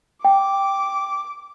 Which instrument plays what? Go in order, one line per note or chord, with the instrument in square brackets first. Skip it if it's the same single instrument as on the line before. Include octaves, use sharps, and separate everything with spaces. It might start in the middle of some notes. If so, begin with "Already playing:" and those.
[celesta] G5 [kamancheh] D6